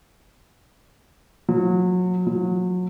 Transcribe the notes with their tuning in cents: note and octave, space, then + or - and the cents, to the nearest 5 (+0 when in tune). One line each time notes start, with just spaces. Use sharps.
F#3 -30
F#3 -30